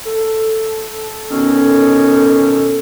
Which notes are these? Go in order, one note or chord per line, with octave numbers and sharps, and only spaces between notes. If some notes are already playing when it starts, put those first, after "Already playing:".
A4
B2 D#3 C#4